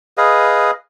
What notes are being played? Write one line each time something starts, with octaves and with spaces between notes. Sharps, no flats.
G#4 B4 D#5 F5